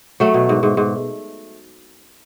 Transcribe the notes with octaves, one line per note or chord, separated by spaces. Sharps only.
F#3 A3
B2
G#2
G#2
G#2